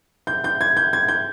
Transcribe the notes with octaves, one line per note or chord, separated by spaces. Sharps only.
G6
G6
G#6
G6
G#6
G6